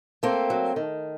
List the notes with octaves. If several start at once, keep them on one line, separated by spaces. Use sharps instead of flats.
A3 A#3 C4
F#3
D#3